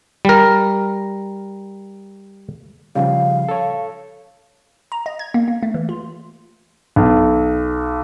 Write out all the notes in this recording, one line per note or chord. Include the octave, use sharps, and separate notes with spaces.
G3 A#4
C#3 F3 G3 F5
A4 C#5
A#5
D#5
G#6
A#3
A#3
A3
E3
F4
B1